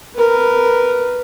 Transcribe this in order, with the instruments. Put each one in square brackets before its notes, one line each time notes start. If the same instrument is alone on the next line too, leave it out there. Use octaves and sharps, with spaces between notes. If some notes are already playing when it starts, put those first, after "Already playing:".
[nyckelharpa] A#4 B4